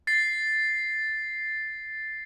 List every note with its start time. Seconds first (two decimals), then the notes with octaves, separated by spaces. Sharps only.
0.07 A6 C7